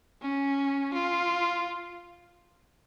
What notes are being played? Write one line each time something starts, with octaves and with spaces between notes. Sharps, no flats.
C#4
F4